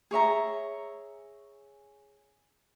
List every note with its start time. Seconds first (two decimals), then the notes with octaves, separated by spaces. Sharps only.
0.11 G#4 C#5 E5 A#5